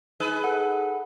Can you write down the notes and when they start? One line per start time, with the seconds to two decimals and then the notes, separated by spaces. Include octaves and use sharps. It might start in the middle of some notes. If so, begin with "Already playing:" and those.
0.20 D#4 G#4 B4
0.44 A4 F#5